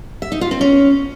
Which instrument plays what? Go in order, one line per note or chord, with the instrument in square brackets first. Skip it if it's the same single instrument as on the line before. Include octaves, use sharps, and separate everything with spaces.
[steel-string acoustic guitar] E5
D#4
F4
C4
C#4